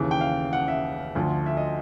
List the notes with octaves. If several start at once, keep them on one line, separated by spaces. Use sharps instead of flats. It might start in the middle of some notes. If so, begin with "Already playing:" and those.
Already playing: D#2 C#3 E3
G5
F5
F#5
E5
D2 D3 F3
E5
D#5